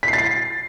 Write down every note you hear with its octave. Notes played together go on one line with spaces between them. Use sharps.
B6
C7
A6
C7